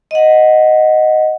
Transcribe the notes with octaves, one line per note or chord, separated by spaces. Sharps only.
D#5 F#5